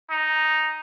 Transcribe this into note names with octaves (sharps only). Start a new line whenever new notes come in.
D#4